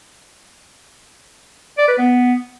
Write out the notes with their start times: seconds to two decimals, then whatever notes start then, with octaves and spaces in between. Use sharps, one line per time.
1.78 D5
1.88 B4
1.98 B3